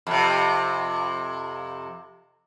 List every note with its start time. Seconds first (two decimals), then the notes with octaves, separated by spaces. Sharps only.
0.07 F2 C3